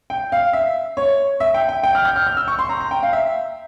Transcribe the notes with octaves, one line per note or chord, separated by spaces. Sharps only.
G5
F5
E5
C#5
E5
G5
G5
G5
F6
G6
F6
F6
E6
C#6
C6
A#5
A#5
G5
F5
E5